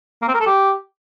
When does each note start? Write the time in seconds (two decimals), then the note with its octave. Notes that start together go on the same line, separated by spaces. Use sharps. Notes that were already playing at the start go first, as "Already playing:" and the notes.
0.22 A#3
0.28 C4
0.34 A#4
0.40 A4
0.46 G4